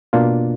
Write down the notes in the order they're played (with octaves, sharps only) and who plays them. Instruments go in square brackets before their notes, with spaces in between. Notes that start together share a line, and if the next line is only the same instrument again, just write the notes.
[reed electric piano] B2 A#3 D4 F4